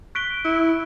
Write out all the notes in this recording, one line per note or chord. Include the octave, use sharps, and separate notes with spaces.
C#6 F#6 B6 D7 G7
E4